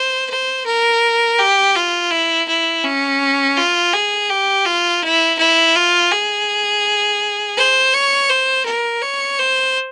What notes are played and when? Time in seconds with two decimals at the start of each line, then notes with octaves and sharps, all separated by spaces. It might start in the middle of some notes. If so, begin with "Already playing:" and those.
Already playing: C5
0.30 C5
0.66 A#4
1.39 G4
1.76 F4
2.11 E4
2.48 E4
2.84 C#4
3.57 F4
3.93 G#4
4.29 G4
4.65 F4
5.02 E4
5.38 E4
5.75 F4
6.11 G#4
7.57 C5
7.94 C#5
8.29 C5
8.65 A#4
9.02 C#5
9.39 C5